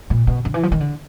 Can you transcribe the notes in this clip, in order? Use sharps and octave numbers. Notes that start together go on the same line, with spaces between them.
A#2
B2
D3
E3
F3
D#3
D3